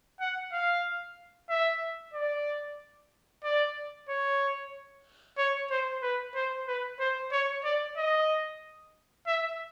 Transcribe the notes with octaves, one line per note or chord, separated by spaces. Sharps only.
F#5
F5
E5
D5
D5
C#5
C#5
C5
B4
C5
B4
C5
C#5
D5
D#5
E5